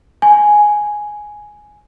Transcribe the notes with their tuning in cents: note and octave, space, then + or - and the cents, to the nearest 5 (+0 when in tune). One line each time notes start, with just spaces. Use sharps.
G#5 +5